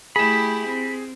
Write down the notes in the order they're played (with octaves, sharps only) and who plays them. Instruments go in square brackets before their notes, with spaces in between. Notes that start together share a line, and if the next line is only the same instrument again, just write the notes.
[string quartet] A3 E4 G4 [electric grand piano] G#4 E7 [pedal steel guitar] B5
[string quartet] C4